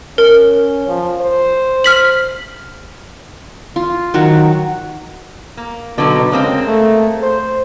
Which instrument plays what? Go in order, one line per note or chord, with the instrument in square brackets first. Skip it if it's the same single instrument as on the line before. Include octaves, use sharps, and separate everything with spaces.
[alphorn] C#4 [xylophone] A#4
[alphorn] F3
C5
[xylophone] F6 B6 F#7
[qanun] F4
D#3 F#3 F#4
[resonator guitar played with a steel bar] A#3
[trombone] B2 [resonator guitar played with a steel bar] D3 F#3 D#4
[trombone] C#3 [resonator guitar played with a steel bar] G#3 A#3 C4
[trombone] A3
C5